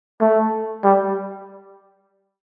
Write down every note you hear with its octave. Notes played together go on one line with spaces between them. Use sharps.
A3
G3